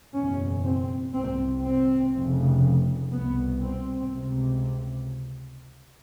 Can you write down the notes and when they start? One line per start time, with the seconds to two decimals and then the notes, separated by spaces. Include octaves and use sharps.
0.13 F#1 E2 B2 C#4
0.63 C4
1.12 C2 C3 C4
1.63 C4
2.13 F1 F2 C#3
3.12 C2 B2 B3
3.62 C4
4.13 C#2 C3